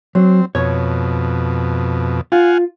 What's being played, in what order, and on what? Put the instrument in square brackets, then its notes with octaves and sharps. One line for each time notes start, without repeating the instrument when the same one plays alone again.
[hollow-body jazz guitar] F#3 [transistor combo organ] C4
[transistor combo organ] F2 B2 [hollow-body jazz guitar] C#5
[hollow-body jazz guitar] F4 [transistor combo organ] F5 F#5 G#5